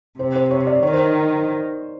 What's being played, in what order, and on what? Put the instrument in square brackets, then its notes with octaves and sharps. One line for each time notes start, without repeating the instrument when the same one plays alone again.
[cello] C3 [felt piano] C5
[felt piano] C5
C#5
D5
[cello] D#3 [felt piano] C#5
[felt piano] C5